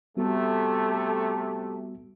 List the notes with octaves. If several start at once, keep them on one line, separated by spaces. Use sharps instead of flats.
C3 G3 A3 B3 F#4